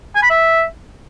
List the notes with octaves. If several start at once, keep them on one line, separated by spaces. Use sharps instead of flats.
G#5
B5
E5